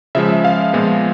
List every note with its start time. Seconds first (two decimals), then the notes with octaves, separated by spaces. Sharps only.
0.15 C#3 F3 G#3 E5
0.45 F5
0.73 A#2 F3 G#3 B3